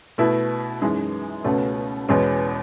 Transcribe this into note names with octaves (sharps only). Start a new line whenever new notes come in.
B2 A3 E4
F#2 E3 G#3 D#4
C#2 B2 A3 C#4 F#4
E2 B2 G#3 C#4